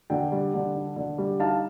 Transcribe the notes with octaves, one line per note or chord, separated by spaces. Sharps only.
D3 G5
G3
D3
D4
D3
G3
D#4 F5 A5